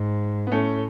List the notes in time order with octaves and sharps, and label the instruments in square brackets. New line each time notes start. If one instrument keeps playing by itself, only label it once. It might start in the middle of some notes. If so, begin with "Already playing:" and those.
Already playing: [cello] G#2
[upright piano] B3
[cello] A2 [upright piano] A3 C#4